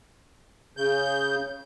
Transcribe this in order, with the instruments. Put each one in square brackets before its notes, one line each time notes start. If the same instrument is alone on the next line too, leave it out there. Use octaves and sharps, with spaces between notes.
[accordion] C#3 G6